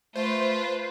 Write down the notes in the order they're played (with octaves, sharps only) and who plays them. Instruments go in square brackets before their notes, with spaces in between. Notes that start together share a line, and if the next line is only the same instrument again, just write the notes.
[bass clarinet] A3 [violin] F4 B4 [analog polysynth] C5